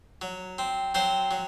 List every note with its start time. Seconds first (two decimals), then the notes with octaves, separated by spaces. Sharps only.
0.22 F#3
0.59 C4
0.95 F#3 C4 C5
1.31 F#3